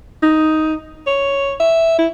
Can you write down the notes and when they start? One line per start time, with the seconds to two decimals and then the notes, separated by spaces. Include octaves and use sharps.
0.22 D#4
1.07 C#5
1.60 E5
1.99 E4